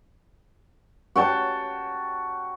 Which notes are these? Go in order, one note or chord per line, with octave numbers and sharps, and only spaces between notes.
F#4 G5 A5